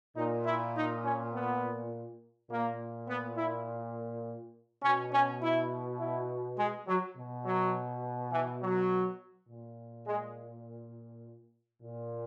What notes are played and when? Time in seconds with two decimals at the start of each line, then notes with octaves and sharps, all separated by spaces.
0.16 A#2 D#4
0.45 E4
0.75 D#4
1.04 C#4
1.33 B3
2.50 A#2 A#3
3.08 B3
3.37 E4
4.82 B2 C#4
5.12 C#4
5.41 E4
5.99 E4
6.58 G#3
6.87 F#3
7.16 B2
7.45 F#3
8.32 E3
8.61 F#3
9.48 A#2
10.07 G#3
11.82 A#2